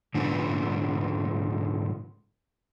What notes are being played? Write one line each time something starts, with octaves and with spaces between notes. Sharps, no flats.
G#2 D3 F3 B3